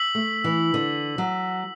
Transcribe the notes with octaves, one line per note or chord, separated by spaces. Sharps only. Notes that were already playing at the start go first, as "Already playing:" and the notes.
Already playing: E6 B6 F#7
A3
E3
D3
F#3